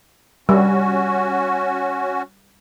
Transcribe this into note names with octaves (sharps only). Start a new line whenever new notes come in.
G3 C#4 F#4